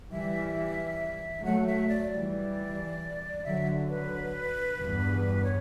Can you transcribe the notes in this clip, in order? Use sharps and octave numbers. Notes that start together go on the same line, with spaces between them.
E3 G3 E5
F#3 A3 F#5
E5
D5
E3 G3 D5
D3 F#3 E5
B4
E2 G2
C#5